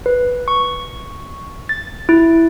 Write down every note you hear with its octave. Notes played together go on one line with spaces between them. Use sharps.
B4
C#6
A6
E4